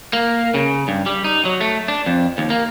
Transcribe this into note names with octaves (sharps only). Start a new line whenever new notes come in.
A#3
C#3
G2
G3
D#4
F#3
A3
D4
F2
D#2
A#3